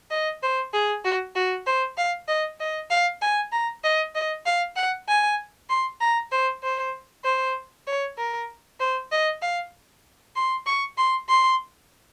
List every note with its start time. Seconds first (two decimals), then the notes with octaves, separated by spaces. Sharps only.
0.11 D#5
0.43 C5
0.74 G#4
1.05 F#4
1.35 F#4
1.67 C5
1.98 F5
2.28 D#5
2.60 D#5
2.91 F5
3.22 G#5
3.52 A#5
3.84 D#5
4.15 D#5
4.46 F5
4.76 F#5
5.08 G#5
5.70 C6
6.01 A#5
6.32 C5
6.63 C5
7.25 C5
7.87 C#5
8.18 A#4
8.80 C5
9.12 D#5
9.42 F5
10.36 C6
10.66 C#6
10.98 C6
11.29 C6